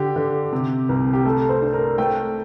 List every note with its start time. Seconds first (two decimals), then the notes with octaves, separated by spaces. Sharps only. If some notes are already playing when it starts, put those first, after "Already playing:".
Already playing: D3 G4
0.16 D3
0.53 C3
0.89 C2
1.13 G4
1.25 A3 A4
1.49 C5
1.62 D4
1.73 A#4
1.98 A3 G5